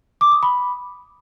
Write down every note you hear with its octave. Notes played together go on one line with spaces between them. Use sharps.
D6
D#6
B5